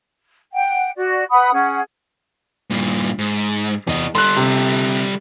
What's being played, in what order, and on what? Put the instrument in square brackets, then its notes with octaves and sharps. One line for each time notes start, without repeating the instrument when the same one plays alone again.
[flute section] F#5 G5
F#4 D5
B4 F#5 B5 D#6
C#4 G#4 F#5
[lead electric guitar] G2 A#2
G#2
[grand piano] E2 [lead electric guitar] C3 D#5
[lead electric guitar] G3 A4 [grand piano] C6 F#6
[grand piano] C3